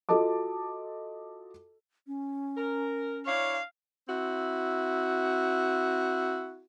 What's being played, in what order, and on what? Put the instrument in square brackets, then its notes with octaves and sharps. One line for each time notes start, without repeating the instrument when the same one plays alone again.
[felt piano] F4 F#4 A4 D#5 A5 D6
[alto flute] C#4
[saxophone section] A#4
[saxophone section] D4 E4 C#5 [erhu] F5
[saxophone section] C4 E4 F#4